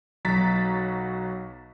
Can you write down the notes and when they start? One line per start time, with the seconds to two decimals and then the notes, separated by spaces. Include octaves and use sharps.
0.25 B1 F#3 F#4 A#5 A6 B6